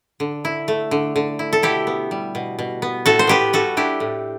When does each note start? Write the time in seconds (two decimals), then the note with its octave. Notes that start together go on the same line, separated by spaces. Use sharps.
0.20 D3
0.45 E4
0.68 A3
0.91 D3
1.16 D3
1.39 E4
1.53 A4
1.62 B2 E4 G4
1.87 B3
2.11 G3
2.35 B2
2.59 B2
2.82 B3
3.06 A2 F#4 A4
3.19 C5
3.27 B3 G4 B4
3.53 G3 F#4 A4
3.77 D4 E4 G4
4.00 A2